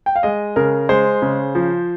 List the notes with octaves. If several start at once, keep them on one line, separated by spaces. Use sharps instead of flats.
G5
F5
G#3 D#5
C#3 A#4
G#3 C5
C#3
F3